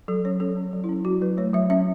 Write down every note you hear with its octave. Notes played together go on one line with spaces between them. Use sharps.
F#3 A4
C#4 C#5
C#4 A4
C#4
F#3
C#4 E4
F#3 F#4
F#3 B4
A3 C#5
F#3 E5
C#4 E5